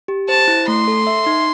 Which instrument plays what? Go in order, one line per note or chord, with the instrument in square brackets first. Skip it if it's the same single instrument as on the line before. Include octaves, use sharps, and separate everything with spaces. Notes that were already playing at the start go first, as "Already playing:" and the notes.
[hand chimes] G4
[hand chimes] C5 [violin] A5
[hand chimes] E4
[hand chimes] A3 [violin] C6
[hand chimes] A4
E5
D#4